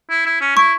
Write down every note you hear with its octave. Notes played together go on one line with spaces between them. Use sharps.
E4
E4
C#4
E4 C#6